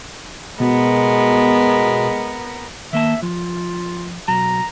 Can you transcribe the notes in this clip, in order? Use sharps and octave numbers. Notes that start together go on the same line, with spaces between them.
B2 G#3 B3 A#4
D#3 A#3 E5 A5
F3 F4
B1 F#3 A#5